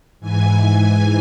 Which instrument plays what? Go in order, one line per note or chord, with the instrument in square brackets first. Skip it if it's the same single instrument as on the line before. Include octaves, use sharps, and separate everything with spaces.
[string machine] G#2 E3 G#5
G#5